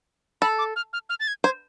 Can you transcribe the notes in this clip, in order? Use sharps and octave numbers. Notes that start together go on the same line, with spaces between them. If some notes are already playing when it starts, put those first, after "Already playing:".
A4 B5
D6
F6
F6
F6
A6
G#6
C5 G#6